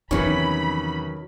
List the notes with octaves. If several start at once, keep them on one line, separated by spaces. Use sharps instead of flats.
E2 C3 D#3 F3 F#3 C#4 B5